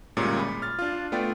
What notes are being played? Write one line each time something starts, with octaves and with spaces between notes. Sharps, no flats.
G1 A#2 G3 G#3 C#4 A#5
B5
F6 A6
D4 F4
A3 B3 F4 D5 G5